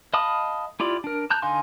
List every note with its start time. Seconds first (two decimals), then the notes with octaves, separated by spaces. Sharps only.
0.14 D#5 F5 A5 B5 D#6
0.80 E4 F4 G4 D5
1.04 D4 A#4
1.30 A5 A#5 F#6 G6
1.42 D3 D#4 F5 G#5 C6